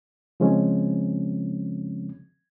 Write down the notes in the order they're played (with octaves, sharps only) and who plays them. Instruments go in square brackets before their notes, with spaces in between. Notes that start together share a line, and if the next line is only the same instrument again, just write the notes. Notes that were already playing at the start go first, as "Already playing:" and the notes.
[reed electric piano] C#3 F3 G#3 C4 C#4